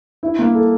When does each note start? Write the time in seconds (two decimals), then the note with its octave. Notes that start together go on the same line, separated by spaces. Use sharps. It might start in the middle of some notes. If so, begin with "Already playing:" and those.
0.23 E4
0.39 A#3
0.55 A4